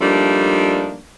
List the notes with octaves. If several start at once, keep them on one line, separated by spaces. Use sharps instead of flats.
F3 G3 A3 A#3 D4 D#4